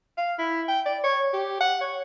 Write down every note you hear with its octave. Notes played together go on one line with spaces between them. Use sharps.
F5
E4
G5
D5
C#5
G4
F#5
C#5